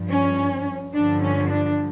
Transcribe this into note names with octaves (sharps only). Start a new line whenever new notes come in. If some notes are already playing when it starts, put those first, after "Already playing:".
Already playing: G2 F3
C#4
G2 D3 F3 D4
C#4
D4